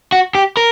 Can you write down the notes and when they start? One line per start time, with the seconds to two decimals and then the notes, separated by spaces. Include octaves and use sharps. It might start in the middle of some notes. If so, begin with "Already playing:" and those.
0.12 F#4
0.35 G4
0.57 A#4